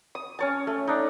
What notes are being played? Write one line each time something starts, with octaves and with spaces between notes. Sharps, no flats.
D#6
C#4 C#5 A5
A3
D4 D#4